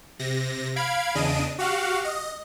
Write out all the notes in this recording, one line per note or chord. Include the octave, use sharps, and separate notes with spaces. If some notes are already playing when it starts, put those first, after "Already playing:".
C3 A#6
F5 B5 G#6 D7
E2 C#3 D4 D#5 D7 D#7
F#4 G4 F5 F#5
D#5